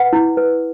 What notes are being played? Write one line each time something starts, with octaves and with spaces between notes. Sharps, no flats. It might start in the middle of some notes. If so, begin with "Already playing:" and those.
Already playing: B4 F#5
E4
B4